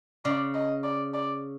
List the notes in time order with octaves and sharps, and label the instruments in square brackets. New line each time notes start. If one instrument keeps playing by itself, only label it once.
[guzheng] C#3 [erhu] D5
[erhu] D#5
D5
D5